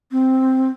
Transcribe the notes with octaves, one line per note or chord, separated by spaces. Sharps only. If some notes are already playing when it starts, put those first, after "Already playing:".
C4